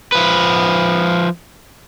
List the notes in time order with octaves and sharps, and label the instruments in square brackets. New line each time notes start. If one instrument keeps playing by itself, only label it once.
[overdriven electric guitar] F3 B4